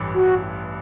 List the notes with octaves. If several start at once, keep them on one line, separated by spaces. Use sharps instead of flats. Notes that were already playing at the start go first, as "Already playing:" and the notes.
Already playing: A1 G2 E3
F#4